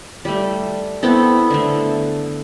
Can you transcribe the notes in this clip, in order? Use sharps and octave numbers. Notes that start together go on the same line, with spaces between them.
G3 A3
B3 C4 E4 A4
D3 A3